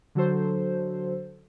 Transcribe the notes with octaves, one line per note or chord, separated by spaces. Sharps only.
D3 F#3 F#4 A4 C5